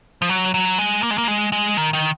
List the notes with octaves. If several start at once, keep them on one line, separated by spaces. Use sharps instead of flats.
F3
F#3
F#3
G#3
A#3
G#3
A#3
G#3
G#3
D#3
D#3